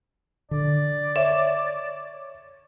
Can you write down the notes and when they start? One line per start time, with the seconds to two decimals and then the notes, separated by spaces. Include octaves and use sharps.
0.51 D3 D5
1.16 C#5 E5